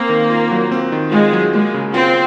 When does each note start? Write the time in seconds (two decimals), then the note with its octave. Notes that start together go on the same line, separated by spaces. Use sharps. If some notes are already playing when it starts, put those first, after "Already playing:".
Already playing: A#3 C4
0.09 D#3
0.30 F4
0.51 F#3
0.72 C4
0.92 D#3
1.12 G#3 F4
1.33 F#3
1.53 G#3 A#3
1.74 C#3
1.94 C4 F4